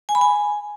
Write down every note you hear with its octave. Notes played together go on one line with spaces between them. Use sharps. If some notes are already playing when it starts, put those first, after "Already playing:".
G#5
B5
G#5